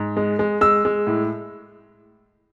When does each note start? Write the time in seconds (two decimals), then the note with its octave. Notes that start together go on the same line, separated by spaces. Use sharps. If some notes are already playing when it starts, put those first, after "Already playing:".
Already playing: G#2
0.17 G#3
0.39 G#3
0.61 G#3 E6
0.85 G#3
1.07 A2